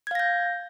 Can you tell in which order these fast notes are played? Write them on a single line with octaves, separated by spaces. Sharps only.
G#6 F5 A#6 G6